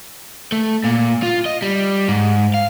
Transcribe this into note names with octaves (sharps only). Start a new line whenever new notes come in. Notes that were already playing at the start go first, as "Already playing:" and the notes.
A3
A#2
F4
D#5
G3
G#2
F5